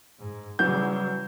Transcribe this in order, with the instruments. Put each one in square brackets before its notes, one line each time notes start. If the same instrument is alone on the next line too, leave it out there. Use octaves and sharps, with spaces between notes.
[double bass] G#2
[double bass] C#3 G3 [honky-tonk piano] E3 F#3 [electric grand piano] G6